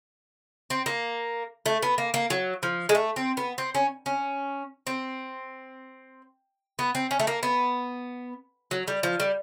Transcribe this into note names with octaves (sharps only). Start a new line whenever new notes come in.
C4
A#3
A3
B3
A#3
A#3
F#3
F3
G#3
A3
C4
B3
C4
C#4
C#4
C4
B3
C4
C#4
A3
A#3
B3
F#3
G3
F3
G3